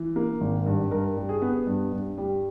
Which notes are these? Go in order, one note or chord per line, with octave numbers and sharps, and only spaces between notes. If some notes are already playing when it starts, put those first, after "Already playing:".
Already playing: E3
A#3
G#1
G2
G2 A#4
G3
G#4
B3
G2
G2
G3